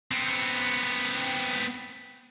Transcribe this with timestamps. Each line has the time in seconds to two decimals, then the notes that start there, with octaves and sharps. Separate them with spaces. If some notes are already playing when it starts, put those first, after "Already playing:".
0.11 B3 C4